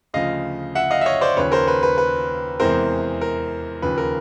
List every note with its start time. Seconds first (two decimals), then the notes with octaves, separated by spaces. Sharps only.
0.14 D2 C#3 F3 D#5 F5
0.75 E5 F#5
0.91 D#5 F5
1.01 E5
1.06 C#5 D#5
1.21 C5 D5
1.37 D#2 C#3 F3 B4 C#5
1.52 A#4 C5
1.68 B4
1.83 B4
1.98 B4
2.60 E2 C3 E3 G#3 C4 A#4 C5
3.21 A#4
3.82 D#2 C#3 F3 B4
3.98 A#4